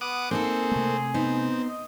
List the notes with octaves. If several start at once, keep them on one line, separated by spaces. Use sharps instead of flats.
B3 F#5 D6 D#6
A#3 C4 D#4 G#4 A4
C3 A3
B3 C4 D#4
D#5